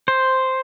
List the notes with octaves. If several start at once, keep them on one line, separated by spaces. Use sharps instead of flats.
C5